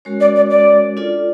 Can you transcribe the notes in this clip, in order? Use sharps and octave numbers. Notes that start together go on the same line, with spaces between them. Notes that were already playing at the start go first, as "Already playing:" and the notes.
G#3 C#4 F#4 A#4 C#5
D5
D5
D5
D4 F4 A4 D5